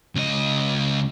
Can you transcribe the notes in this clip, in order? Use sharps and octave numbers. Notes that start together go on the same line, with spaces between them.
C#2 D#5